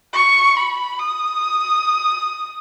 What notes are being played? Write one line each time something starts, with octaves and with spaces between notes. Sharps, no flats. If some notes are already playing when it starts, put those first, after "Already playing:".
C#6
B5
D#6